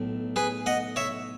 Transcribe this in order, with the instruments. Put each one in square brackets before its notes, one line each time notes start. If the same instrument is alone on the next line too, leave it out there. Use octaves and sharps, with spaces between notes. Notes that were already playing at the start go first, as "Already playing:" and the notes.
Already playing: [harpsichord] B1 A2
G#4 B4
D#5 F#5
C#5 E5